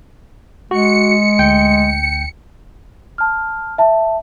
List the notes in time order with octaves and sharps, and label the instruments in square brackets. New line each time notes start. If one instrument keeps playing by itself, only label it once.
[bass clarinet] G#3 [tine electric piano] F#4 [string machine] C#7
[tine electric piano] D2 G5
[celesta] A5 F6
E5 A5